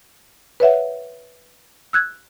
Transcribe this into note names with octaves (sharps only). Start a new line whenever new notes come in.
B4 C#5 E5 F#5
E6 F#6 G#6